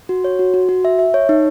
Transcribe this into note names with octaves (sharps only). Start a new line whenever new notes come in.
F#4
C#5
F#4
F#4
F#4
E5
E5
C#5
D#4